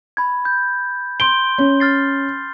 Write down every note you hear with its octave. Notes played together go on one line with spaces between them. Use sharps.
B5 G#6
G6
C6 G6 D7 G7
C#4
F6 A6 C7